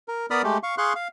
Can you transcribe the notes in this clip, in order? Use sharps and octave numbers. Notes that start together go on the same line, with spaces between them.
A#4
B3 A#4 D5 B5 D#6 F6
G#3 A3 G4
F5 C#6
G#4 F5 C6 C#6 F#6
F5